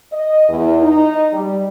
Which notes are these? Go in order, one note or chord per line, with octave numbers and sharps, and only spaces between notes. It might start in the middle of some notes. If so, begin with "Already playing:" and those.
D#5
E2
D#4
G3